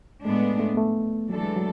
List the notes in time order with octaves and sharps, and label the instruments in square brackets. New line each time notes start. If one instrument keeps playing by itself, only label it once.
[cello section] A2 G#3 B3 D4 [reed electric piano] A3
[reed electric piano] A3
A3
B3
A3
[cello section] E3 A3 D4 A4 [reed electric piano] F#3
[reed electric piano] G#3
F#3